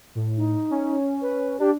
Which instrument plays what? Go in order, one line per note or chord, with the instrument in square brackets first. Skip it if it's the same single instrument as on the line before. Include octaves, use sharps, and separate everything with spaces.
[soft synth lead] A2
[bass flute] D#4
[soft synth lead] C#4
[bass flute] B4
[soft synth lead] D4 [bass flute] G4